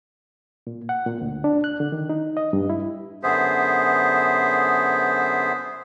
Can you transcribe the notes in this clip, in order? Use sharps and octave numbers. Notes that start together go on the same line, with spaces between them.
A#2
F#5
A#2
D2
D4
F#6
D3
D#3
D#4
D#5
G2
E4
F#2 D3 B3 G#4 C5 E5